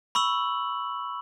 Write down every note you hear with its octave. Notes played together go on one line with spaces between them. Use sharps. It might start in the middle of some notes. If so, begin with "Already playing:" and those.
B5 C#6 E6 F#7